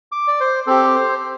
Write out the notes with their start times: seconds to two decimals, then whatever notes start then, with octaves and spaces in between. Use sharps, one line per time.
0.12 D6
0.28 D5
0.40 C5
0.67 C4 G4 A4
0.95 C5